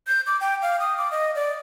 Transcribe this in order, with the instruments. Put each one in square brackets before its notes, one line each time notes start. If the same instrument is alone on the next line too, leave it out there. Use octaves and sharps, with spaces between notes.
[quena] G6
D6
G5
F5
D#6
D6
D#5
D5